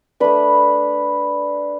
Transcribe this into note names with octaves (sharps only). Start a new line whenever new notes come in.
A3 D4 B4 B5